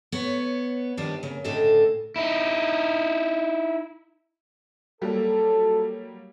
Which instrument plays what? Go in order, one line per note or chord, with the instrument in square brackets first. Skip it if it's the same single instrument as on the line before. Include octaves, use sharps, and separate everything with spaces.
[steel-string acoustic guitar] B3 C#5
D#3 F3 G3 B3 D4
C#3 A#3
D2 A2 C#3 D4 A4 D#5
[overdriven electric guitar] D#4 E4
[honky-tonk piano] F#3 G3 A#3 [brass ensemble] A4